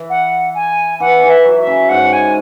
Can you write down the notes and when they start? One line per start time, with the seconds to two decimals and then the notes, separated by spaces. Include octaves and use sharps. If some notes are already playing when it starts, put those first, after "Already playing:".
Already playing: E3
0.10 F#5
0.55 G#5
1.00 E3 F#5
1.23 E3
1.30 E5
1.45 F#3
1.60 E5
1.67 C#3
1.89 G#2 F#5
2.13 G#5